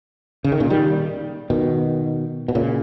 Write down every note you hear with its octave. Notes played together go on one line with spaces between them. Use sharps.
C#3
D#3
A#2 C#3
D#3 G3
B2 D#3
B2
A#2 C#3